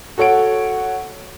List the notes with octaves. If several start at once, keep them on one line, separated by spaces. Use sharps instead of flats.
F#4 A4 C#5 F#5 D7